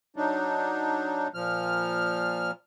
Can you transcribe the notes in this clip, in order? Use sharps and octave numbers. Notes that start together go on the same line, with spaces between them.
F#3 D4 D#4
A#2 F3 F6